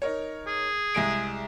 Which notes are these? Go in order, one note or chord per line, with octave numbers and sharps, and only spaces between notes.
D#4 A#4 C#5
G#4
C2 G#3 D7